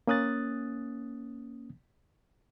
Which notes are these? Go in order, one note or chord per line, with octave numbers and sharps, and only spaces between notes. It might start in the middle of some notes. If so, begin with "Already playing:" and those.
A#3 C#4 D#6 F#6 A6